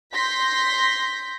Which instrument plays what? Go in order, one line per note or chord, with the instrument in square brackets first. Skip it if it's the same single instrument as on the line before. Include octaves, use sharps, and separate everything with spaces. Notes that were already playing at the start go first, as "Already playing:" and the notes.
[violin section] C6 G6 A#6 B6